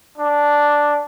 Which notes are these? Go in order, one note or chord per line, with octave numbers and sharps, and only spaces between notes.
D4